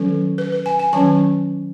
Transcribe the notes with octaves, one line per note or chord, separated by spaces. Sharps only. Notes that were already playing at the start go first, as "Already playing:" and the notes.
Already playing: D#3 F#3 C#4 A4
B4
B4
G#5
G#5
D#3 F#3 C#4 A5